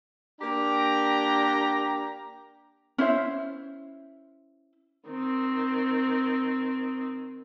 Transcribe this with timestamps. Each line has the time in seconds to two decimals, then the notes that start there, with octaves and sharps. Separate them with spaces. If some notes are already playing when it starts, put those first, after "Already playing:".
0.41 A#3 D4 G4 G5 A#5
2.98 C#4 E4 C5 E5
5.06 D#3 C4